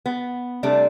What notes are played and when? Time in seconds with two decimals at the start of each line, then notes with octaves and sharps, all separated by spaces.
0.06 B3
0.63 C3 G3 A3 D4